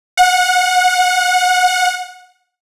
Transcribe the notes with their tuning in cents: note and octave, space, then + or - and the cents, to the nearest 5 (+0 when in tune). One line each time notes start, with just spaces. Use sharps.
F#5 -25